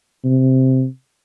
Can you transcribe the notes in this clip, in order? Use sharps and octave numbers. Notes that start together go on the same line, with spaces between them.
C3